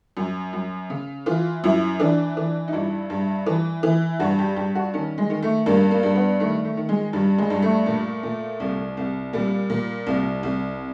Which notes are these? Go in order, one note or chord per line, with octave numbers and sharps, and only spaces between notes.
F#2
F#2
C#3
E3 F4
F#2 E4
E3 D4
E3
D#4
G2 E4
G2
E3
E3
G2 F#4
G4
G2 G4
F#4
D#3 C#4
G#3
D#3
A3
G2 A#3
A#3
G2
B3
D#3 A3
A3
D#3
G#3
G2 G3
G#3
G2
A3
A#2
A#2
C2
C2
A#2 G3
A#2
C2
C2